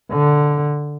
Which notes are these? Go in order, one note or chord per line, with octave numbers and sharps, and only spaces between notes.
D3